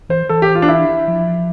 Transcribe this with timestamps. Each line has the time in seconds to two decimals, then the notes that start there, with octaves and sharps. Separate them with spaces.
0.09 E3 C5
0.29 E3 A4
0.42 G4
0.55 F4
0.62 D4
0.68 E4
1.08 F3